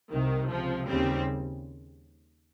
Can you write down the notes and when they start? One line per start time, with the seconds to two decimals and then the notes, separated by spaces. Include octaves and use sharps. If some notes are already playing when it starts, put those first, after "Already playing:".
0.13 C2 C3 D#3
0.51 C#2 C3 F3
0.88 D#2 C#3 G3 C4